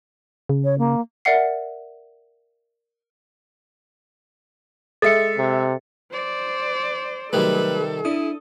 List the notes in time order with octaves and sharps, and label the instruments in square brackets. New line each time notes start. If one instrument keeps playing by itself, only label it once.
[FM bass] C#3
[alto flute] C#5
A#3
[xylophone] A#4 D5 E5 F#5 C7
[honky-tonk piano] G#3 E5 [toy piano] A4 [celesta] A6 C#7
[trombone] C3
[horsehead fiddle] C5 D5
[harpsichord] C3 D#3 G3 [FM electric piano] F#3 A3 [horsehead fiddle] A4 [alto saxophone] B4
[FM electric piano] D4 D#6 [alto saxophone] E4